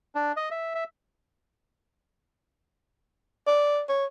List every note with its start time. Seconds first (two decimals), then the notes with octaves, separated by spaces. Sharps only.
0.15 D4
0.36 D#5
0.51 E5
0.75 E5
3.47 D5
3.89 C#5